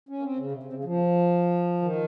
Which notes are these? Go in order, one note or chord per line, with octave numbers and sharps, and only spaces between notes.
C#4
A#3
C4
C#3
C3
C3
C#3
F3
D#3